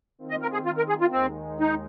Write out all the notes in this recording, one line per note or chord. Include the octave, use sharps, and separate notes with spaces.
D#3 C4 F4
D#5
A#4
G#4
F4
A#4
G#4
F4
D#2 D#3 G#3 C4 D#4
D#4